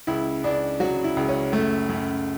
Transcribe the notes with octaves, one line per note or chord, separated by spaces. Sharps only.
C#2 E4
C#2 D4
F#3 F#4
E4
C#2
C#4
F#2 A3
F#2